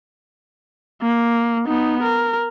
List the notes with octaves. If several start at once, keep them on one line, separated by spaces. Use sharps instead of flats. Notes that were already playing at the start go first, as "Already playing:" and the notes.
A#3
B3 D#4
A#4